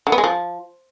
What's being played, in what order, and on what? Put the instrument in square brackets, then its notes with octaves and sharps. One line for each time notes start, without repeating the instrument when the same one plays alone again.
[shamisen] D3
B3
G#3
F3